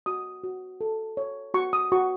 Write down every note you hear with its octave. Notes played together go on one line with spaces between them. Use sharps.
F#4 D#6
F#4
A4
C#5
F#4 C#6
D#6
F#4 C#6